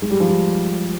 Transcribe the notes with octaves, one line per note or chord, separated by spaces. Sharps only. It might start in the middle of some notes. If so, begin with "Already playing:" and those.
G#3
G3
F3
G3